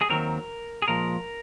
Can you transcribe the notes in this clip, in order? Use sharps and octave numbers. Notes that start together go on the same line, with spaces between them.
G#4
D#2 D#3 F#3 C4 A#4
G#4
A#2 F3 G#3 A#4